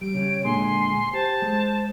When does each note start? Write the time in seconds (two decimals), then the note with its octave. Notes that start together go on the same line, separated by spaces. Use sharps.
0.01 G3 D7
0.14 C#3 G3 C#5
0.44 A#2 D3 G#3 G#5 C6
1.13 G4 C5 A5
1.42 G#3